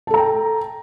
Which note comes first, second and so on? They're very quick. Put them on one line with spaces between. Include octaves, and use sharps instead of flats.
A5 A4 A#5 G5